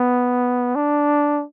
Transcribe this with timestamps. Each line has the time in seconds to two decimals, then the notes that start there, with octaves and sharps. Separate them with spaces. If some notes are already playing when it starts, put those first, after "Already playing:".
Already playing: B3
0.75 D4